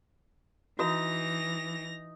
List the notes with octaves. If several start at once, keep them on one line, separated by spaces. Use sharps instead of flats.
E3 D#4 F#4 A#6 F7